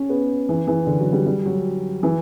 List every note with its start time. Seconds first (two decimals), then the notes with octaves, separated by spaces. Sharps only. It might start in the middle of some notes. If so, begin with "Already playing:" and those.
Already playing: C#4
0.09 B3
0.49 E3
0.67 E3
0.87 D3
1.00 F#3
1.13 G3
1.26 G3
1.45 F#3
2.03 E3